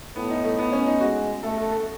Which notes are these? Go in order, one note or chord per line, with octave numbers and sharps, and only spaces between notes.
A2 B3
D#4
A3
B3
C#4
D#4
G#3 F#4
A3 A4
A4
A4